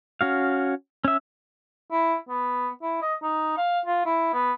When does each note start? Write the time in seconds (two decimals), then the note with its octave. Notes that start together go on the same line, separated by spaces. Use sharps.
0.21 C#4 F#4 F5
1.04 C#4 E5
1.92 E4
2.29 B3
2.82 E4
3.02 D#5
3.22 D#4
3.57 F5
3.86 F4
4.06 E4
4.33 B3